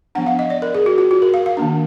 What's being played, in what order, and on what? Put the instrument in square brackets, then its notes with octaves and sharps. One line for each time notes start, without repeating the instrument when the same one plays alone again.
[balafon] F3 B3 D4 F#5
F5
D#5
D5
A#4
G#4
F#4
F4
F#4
A#4
F5
F5
D#3 A#3 D4